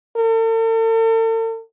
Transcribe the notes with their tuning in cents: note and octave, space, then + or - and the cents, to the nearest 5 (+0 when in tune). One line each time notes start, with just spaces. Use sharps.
A4 +45